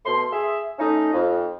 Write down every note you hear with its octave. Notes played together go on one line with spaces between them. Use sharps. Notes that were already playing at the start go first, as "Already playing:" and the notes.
B2 A3 C6
G#4 E5
A3 C#4 D#4
F2